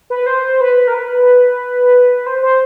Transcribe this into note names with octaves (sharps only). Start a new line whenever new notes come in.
B4
C5
B4
A#4
B4
C5
C5